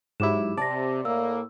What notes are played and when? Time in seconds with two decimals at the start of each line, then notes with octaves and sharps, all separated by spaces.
0.20 G#2 F#3 E4 G4 D6 E7
0.57 C3 D5 A5 A#6
1.05 A2 A#3 E6